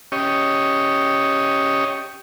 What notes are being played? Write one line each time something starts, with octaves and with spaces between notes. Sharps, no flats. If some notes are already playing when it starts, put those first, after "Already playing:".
C#4 G4 C#5 D#5